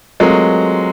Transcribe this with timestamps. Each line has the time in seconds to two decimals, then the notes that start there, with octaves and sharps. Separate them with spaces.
0.20 F#3 G#3 A3 C4 F4 A#4